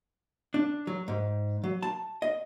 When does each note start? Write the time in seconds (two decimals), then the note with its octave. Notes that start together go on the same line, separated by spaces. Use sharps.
0.54 D4
0.87 F#3
1.08 G#2
1.64 F#3
1.83 A5
2.22 D#5